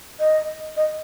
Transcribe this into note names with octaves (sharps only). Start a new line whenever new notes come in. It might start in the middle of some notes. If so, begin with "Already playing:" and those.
D#5
D#5